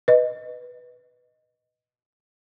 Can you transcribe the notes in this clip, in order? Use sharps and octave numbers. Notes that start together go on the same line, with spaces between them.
B4 D#5